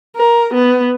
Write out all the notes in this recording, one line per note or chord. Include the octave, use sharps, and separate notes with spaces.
A#4
B3